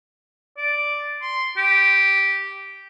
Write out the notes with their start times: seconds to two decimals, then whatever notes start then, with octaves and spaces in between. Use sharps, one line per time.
0.58 D5
1.22 C6
1.58 G4